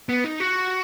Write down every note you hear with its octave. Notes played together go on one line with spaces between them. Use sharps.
B3
D#4
F#4